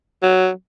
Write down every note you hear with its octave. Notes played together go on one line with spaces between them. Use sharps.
F#3